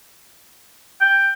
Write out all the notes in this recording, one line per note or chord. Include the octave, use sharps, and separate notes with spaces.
G5